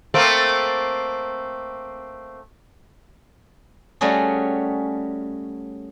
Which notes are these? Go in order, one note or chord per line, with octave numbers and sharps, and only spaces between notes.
A3 A#3 C4
G3 A3 C#4 F#4 G#4